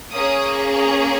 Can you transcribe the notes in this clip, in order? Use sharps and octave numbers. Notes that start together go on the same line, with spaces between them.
A#3 C#4 G#4 D#6
A#5